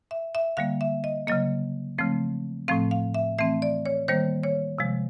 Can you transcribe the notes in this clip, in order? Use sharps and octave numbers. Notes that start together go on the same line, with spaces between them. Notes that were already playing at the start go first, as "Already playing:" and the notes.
E5
E5
D3 G3 A#3 F5
E5
D#5
C#3 F#3 A#3 D#5
C#3 F3 A3 C4
A2 F3 A3 C4 F5
F5
E5
E3 A3 C4 E5
D5
C#5
D#3 G3 A#3 C5
C#5
C3 F3 G#3